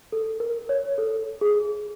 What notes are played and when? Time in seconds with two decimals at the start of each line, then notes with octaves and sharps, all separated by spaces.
0.12 A4
0.40 A#4
0.69 C#5
0.98 A4
1.41 G#4